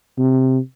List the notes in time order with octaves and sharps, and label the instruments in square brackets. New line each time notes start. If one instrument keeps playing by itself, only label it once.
[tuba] C3